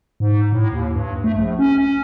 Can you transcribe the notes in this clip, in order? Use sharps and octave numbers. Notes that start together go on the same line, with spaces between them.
G#2
A2
D#2
G2
A3
A#1
C#4